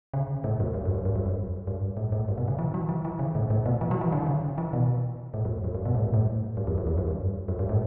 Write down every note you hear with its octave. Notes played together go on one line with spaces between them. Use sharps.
C#3
A2
F#2
G2
F#2
G2
G2
F#2
F#2
G2
A2
A2
G2
B2
C#3
E3
F#3
E3
E3
C#3
A2
A2
B2
E3
F#3
E3
D3
C#3
E3
B2
A2
F#2
F#2
G2
B2
A2
G2
A2
G2
E2
F#2
E2
F#2
G2
F#2
G2
A2